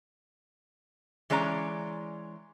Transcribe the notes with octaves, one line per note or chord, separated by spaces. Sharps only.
E3 G#3 C#4 D5 A#5